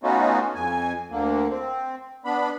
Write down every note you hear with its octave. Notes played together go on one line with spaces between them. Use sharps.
A3 B3 C#4 D#4 F4 F#4
F2 G#5
D2 D3 A#3
C4
B3 D4 B5